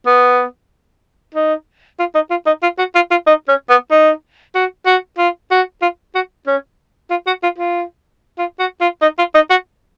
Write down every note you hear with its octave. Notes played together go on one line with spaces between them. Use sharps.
B3
D#4
F4
D#4
F4
D#4
F4
F#4
F4
F4
D#4
C#4
B3
D#4
F#4
F#4
F4
F#4
F4
F#4
C#4
F4
F#4
F4
F4
F4
F#4
F4
D#4
F4
D#4
F#4